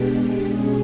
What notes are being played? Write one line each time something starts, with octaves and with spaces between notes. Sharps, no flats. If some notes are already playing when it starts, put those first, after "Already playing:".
Already playing: B2 G#3 B3 D4 G4
B2 G#3 C#4 G#4